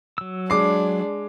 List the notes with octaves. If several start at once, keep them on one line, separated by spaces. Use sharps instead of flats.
F#3 E6
G#3 D4 D6 C7